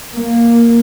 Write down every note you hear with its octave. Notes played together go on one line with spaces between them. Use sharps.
A#3